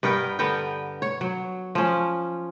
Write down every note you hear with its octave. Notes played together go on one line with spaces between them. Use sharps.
G2 B3 A#4 G5
D3 B3 A#4 G5
C#5
F#3
F3 C#4